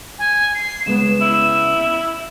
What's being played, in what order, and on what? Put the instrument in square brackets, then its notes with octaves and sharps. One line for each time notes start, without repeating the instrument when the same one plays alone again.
[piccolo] G#5
C7
[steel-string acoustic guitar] C#3 G#3 B3 [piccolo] E7
[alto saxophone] E4